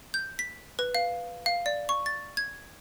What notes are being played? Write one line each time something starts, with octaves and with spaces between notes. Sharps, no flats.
G6
B6
B4
F5
F5
D5
C#6
A6
G#6